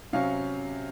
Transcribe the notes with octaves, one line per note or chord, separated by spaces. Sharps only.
C3 F#3 C#4 F5